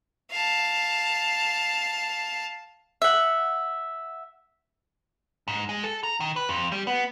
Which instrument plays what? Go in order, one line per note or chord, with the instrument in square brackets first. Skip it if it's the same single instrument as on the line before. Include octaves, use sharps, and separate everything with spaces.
[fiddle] F5 A5
[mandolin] E5 F#5
[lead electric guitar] G#2
G#3
A4
A#5
D#3
B4
F2
G3
B3